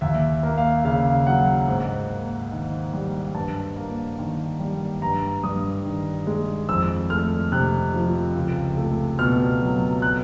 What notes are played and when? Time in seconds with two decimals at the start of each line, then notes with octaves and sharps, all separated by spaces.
0.01 D#2 E5
0.43 A#3
0.58 F5
0.85 C#3 F5
1.26 F#3 F#5
1.68 G#2
2.10 A#3
2.52 D#3
2.93 G3
3.35 G2 A5
3.76 A#3
4.19 D#3
4.60 G3
5.02 G2 A#5
5.44 G2 D#6
5.85 D#3
6.27 G#3
6.69 F2 E6
7.10 A3 F6
7.52 C3 F#6
7.94 F3
8.36 C#2
8.77 A3
9.19 B2 F6
9.61 F#3
10.02 F#6